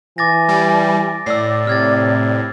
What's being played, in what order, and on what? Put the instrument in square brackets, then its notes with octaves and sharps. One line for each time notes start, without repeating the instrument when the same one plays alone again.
[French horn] E3 [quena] G#5 [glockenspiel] D6 A6 A#6
[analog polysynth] G3 [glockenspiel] A6 D7
[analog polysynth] A2 [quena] D5 [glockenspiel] E6 C7
[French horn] C3 [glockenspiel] F6 G#6 A6